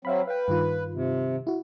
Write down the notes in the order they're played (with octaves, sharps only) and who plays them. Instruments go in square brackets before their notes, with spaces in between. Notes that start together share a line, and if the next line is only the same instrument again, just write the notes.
[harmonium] F#3 C4 [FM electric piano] E5 F5 B5
[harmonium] B4 [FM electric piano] F5 G5
[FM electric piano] G2 D#3 F4
[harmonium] C3
[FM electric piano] E4 F#4